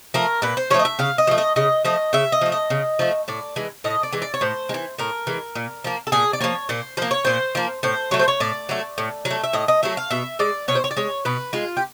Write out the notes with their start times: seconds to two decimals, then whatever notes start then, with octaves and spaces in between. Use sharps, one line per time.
0.14 F3 A3 A#4
0.42 A#2 B4
0.57 C5
0.70 F3 C#5
0.74 A3 D#5
0.85 E5
0.99 C#3 F5
1.18 D#5
1.27 F3 A3
1.38 D#5
1.56 C#3 D#5
1.85 F3 A3 D#5
2.13 C#3 E5
2.32 D#5
2.41 F3 A3
2.52 D#5
2.70 C#3
2.99 F3 A3
3.28 A2 D5
3.56 E3 G#3
3.84 A2 D#5
4.03 D5
4.12 E3 G#3
4.22 D5
4.34 C#5
4.41 A2 C5
4.69 G#3
4.74 E3
4.98 A2 A#4
5.27 E3 G#3
5.55 A#2
5.84 F3 A#3
6.07 A4
6.12 A#2 G#4
6.33 D5
6.41 F3 A#3 C#5
6.69 A#2 C5
6.97 F3 A#3 C5
7.11 C#5
7.25 A#2 C5
7.55 F3 A#3
7.83 A2 C5
8.11 F#3 A3 C#5
8.19 C5
8.28 C#5
8.40 A2 D5
8.69 F#3 A3
8.98 A2
9.25 F#3
9.30 A3
9.44 E5
9.53 A2 D#5
9.68 D#5
9.83 F#3 A3 E5
9.97 F5
10.11 B2 E5
10.39 G#3 D5
10.68 B2 C#5
10.75 C5
10.84 C#5
10.91 D5
10.97 G#3 C#5
11.25 B2 B4
11.53 G#3 F4
11.77 G4